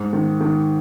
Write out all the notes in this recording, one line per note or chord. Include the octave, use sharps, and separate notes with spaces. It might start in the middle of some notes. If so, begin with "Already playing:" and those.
Already playing: G#2
D#3
D#3